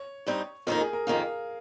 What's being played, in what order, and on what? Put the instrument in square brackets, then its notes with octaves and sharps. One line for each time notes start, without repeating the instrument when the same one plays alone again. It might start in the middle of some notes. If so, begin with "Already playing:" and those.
Already playing: [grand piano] C#5
[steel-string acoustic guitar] G2 G3 C4 D#4
[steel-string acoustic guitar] F2 D#3 A#3 D#4 [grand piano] A#4
[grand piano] G#4
A#4
[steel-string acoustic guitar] F2 D#3 A#3 D#4 [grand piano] F5